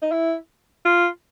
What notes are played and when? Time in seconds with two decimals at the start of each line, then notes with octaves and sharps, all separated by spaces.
0.02 D#4
0.12 E4
0.85 F4